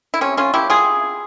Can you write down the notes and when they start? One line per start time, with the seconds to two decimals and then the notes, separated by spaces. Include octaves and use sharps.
0.14 E4
0.21 C3 C#4
0.37 C#4 F4
0.54 F3 A#3 E4 G4
0.70 F4 G#4
0.85 C3